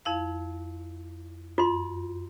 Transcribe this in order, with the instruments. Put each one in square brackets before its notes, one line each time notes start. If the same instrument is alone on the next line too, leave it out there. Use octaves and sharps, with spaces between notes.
[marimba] F2 E4 F5
[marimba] F#2 [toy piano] F4 C6